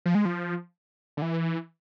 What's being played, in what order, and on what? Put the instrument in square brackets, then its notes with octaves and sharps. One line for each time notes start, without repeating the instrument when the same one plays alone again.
[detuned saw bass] F3
G#3
F3
D3
E3